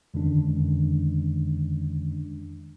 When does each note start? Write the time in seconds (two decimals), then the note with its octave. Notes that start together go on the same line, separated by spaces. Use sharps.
0.14 F2 D3 D#3 G#3 C#4 D4